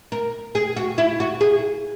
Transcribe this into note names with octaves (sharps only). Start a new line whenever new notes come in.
A#4
G#4
F#4
E4
F#4
G#4